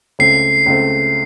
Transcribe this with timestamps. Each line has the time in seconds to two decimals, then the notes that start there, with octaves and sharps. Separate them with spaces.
0.19 C#2 C#3 A3 C4 C7
0.66 C#2 C#3 A3 C4